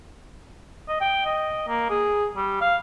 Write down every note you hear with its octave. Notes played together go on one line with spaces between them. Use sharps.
D#5
G5
D#5
A#3
G#4
G3
F5